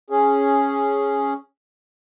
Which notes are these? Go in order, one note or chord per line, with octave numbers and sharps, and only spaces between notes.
C#4 G#4